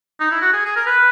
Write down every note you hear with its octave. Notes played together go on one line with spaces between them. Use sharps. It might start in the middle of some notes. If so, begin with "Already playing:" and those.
D#4
E4
F#4
G#4
G#4
A#4
B4